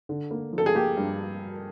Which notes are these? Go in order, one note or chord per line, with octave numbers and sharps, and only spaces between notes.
D3
A#3
F3
A4
G#4
A#3 G4
G2